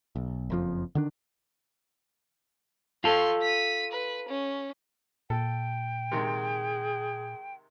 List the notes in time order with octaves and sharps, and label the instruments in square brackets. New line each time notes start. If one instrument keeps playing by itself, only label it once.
[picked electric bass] B1
F#1 F2 F3
D3 D#3 D4
[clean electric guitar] F4 A4 [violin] C6 C#6
[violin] B6 D#7
B4
C#4
[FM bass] A#2 [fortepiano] A4 [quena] G5
[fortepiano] C3 D#3 G#3 [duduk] G#4